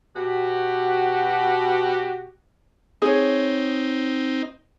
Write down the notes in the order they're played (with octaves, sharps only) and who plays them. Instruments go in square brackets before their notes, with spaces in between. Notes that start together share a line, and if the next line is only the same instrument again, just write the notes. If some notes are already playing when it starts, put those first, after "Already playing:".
[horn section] B2 F#4 G4
[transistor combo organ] C4 D#4 [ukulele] G#4 C#5